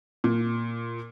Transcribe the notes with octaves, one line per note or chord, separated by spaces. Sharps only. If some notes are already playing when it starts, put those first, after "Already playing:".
A#2